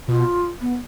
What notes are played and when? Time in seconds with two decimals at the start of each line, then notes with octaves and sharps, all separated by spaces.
0.08 B2 F4
0.61 B3